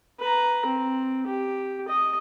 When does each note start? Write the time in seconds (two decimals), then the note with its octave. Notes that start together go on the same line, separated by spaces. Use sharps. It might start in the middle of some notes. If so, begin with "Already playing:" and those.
0.20 B4 A#5
0.66 C4
1.27 G4
1.88 D#5